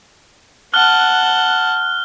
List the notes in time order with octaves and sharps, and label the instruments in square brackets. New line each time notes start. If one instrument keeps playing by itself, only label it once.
[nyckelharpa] F#5 A5 [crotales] F6 F#6 G7